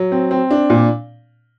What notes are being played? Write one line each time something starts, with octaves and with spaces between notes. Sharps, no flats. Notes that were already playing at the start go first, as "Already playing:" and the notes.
Already playing: F#3
C4
C4
D4
A#2